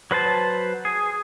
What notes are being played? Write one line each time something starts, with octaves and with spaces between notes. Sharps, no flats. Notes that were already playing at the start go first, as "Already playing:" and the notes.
F#3 B4 C5 A5
G#4